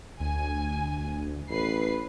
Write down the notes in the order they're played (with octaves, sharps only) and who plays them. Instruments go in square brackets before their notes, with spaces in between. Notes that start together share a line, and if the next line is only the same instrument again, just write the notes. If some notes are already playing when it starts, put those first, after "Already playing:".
[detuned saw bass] D2 [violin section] G#5
[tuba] A1 [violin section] B4 C7